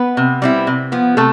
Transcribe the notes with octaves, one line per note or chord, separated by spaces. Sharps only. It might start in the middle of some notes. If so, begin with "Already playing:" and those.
Already playing: B3 B4
C3
G3 C4 E4
C3
F3 B3
C3 A3 A4